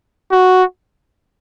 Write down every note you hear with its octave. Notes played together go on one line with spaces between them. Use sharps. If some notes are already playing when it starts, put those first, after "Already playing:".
F#4